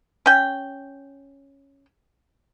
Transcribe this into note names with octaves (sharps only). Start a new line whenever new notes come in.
C#4 G5